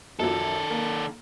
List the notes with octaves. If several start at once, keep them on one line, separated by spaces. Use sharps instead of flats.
F#2 D#3 F3 F#3 A4
A#3